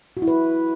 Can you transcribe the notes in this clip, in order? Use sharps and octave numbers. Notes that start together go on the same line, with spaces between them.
F#4
E4
B4